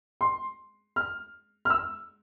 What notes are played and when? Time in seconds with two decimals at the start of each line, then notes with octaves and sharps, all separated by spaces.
0.21 C6
0.96 F6
1.65 F6
1.70 E6